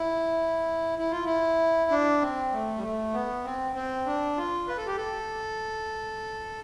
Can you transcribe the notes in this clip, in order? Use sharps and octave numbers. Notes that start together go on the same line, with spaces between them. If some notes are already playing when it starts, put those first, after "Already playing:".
Already playing: E4
E4
F4
E4
D4
C4
A3
G3
A3
B3
C4
C4
D4
F4
B4
A4
G4
A4